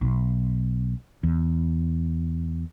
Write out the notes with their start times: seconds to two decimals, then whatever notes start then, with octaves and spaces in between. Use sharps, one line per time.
0.02 B1
1.23 E2